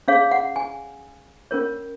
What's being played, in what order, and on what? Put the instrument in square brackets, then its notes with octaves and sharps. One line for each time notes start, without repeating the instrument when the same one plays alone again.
[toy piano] C#4 G#4 C#5 F5
F#5
G#5
C#4 F4 A#4 C#5